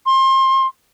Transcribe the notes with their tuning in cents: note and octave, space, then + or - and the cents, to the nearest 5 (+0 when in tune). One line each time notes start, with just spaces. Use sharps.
C6 +30